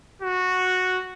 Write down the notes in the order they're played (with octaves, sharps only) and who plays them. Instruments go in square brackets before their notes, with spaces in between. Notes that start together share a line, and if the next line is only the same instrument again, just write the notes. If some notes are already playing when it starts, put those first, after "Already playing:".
[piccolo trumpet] F#4